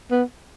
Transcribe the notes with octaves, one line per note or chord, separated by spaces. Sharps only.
B3